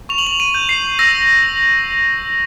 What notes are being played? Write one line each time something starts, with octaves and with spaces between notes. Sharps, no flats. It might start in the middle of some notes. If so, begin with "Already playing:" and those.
C#6 F7
F#7
F7
D#7
G6
C7
E6 A#6